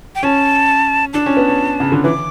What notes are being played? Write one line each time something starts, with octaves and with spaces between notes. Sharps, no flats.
G5
C#4 A5
D4 A5
C#4
B3
C#4
C#3
D3
E3 D6